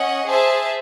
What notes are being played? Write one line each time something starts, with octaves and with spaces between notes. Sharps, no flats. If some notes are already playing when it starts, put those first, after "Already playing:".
Already playing: C#4 D#5 F#5
G#4 C5 E5 A5